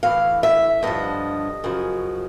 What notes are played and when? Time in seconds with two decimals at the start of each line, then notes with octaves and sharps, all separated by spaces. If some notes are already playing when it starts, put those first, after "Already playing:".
0.03 A2 E3 F5
0.43 E5
0.83 G2 D3 F3 D#5
1.64 F#2 C#3 F3